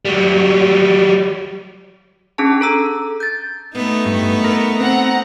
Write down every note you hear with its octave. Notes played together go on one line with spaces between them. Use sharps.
F#3 G3
C#4 D4 G#4 A5
A4 A#5 E6
G6 A6
A3 B3 D#4
G2
A#4
C4 F#5 A#5